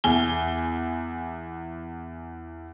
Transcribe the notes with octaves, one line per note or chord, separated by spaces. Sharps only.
E2 G#5 G7